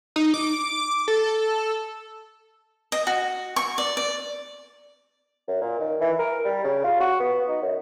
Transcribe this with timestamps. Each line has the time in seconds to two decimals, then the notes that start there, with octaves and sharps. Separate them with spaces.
0.16 D#4
0.34 D6
1.08 A4
2.92 D#5
3.07 F#4
3.56 C#6
3.78 D5
3.97 D5
5.48 F#2
5.61 A#2
5.79 D#3
6.00 E3
6.19 A#4
6.44 G3
6.64 C#3
6.84 F4
7.00 F#4
7.19 B3
7.48 D#4
7.62 F#2